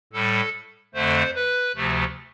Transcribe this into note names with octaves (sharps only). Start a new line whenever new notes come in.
A2 G3 A4
F2 D3 A3 C5
B4
D2 C3 F3 A3